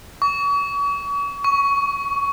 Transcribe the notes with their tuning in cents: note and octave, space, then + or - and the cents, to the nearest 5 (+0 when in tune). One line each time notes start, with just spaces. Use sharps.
C#6 +40
C#6 +10